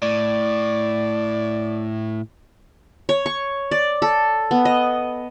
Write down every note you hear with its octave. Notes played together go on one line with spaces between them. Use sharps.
A2 D5
C#5
C#6
D5
A4
B3
D#5